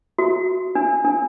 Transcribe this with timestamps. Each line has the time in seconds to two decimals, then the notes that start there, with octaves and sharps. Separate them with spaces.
0.19 F#4
0.75 D4
1.05 D4